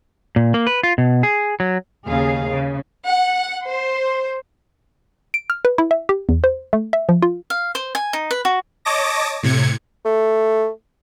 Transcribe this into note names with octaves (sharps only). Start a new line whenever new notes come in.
A#2
A#3
B4
F4
B2
G#4
F#3
D#2 C#3 G#4 F5
C#3
F#5
C5
D7
F6
B4
E4
E5
G4
E2
C5
A3
E5
F3
F4
F5
C5
G#5
D#4
B4
F#4
C#5 D#5 A5 D6 A#6
A2 C3 G#6 C#7
A3